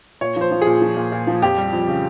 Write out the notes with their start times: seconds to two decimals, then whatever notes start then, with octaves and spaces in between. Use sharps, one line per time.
0.21 A#2 C#5
0.36 F3 C5
0.51 F3
0.62 G#4
0.67 A#2
0.82 F3
0.97 A#2
1.12 A#2
1.27 F3
1.42 F2 G4
1.58 G3
1.73 F2
1.88 C#3